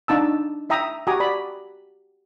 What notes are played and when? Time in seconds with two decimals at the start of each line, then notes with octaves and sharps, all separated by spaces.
0.08 D4 D#4 A5 E6
0.70 E4 E5 G5 A#5 D#6
1.07 F#4 G4 G#5 A#5 D6 D#6
1.20 D5 B5